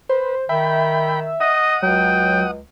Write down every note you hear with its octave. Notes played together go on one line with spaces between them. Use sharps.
B4 C5
D#3 E5 G5 B5
D#5 F#5 D#6
C#2 F#3 G5